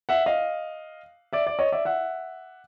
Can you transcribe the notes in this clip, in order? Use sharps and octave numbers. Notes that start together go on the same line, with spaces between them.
E5 F#5
D#5 F5
D5 E5
D5
C#5 D#5
D5 E5
E5 F#5